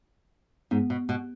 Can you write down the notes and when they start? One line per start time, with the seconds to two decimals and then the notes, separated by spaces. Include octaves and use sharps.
0.71 G#2 B3
0.90 B2
1.09 B2